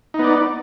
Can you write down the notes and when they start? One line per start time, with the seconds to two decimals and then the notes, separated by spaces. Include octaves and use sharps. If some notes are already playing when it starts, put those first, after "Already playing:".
0.14 D#4
0.19 B3
0.24 D5